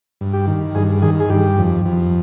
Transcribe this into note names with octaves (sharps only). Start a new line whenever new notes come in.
G2
G4
D#3
G2 G#4
D#3 G#4
G#4
G2 G4
F2
F2